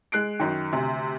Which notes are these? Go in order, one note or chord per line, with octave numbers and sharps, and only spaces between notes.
G#3 F#6 C7 D7
F#2 D#3
D2 C3